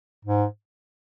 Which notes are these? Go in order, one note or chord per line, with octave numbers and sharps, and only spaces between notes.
G#2